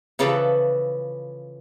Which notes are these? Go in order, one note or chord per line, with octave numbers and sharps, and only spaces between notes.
C#3 E3 F3 A4 B4